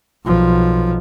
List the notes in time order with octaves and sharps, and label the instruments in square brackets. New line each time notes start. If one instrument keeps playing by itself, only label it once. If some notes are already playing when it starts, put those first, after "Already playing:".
[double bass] B1 F3